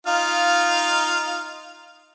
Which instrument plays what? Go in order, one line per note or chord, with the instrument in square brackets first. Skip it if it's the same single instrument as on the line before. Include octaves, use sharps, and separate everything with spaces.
[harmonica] D#4 F4 F5